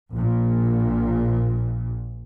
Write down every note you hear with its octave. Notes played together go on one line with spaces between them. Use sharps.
A#1 A#2